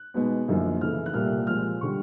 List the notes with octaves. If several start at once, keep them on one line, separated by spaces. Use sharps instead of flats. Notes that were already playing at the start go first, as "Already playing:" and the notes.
Already playing: F#6
B2 G#3 B3 D#4
F#2 D3 F3 A#3 D#4
C#3 E3 A3 F6
F#6
C2 A#2 G3 A#3 F6
A#2 F3 G#3 F6
D3 G3 C#6